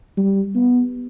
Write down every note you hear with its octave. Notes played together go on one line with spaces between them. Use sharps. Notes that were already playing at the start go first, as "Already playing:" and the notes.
G3
B3